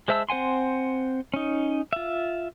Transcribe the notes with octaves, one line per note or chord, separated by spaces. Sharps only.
G#3 C5 E5 A5 E6
C4 C5 F#5 G#5 C6
C#4 D#4
F4 E5